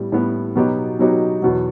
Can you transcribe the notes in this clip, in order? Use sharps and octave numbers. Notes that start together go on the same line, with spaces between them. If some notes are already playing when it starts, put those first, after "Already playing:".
Already playing: A2 G3 B3
A2 G3 B3
B2 F#3 B3 D#4 G4
B2 F#3 B3 D#4 G4
E2 B2 F#3